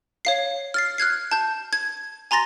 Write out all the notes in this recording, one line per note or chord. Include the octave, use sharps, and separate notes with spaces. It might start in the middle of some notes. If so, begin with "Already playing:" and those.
C#5 F5 C7
F6 A6 C7
F6 F#6 G#6 C7
A5 G6
G#6
G#5 A#5 C6 A6 A#6